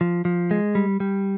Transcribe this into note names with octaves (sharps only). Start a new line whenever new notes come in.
F3
F3
G#3
G3
G3